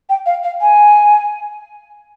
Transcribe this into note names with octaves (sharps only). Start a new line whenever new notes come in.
G5
F5
F5
G#5